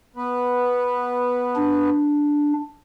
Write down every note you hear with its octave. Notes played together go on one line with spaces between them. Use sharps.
B3 B4
D4